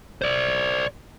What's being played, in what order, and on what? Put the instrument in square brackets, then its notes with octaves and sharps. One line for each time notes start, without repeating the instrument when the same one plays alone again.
[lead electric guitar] C5 D5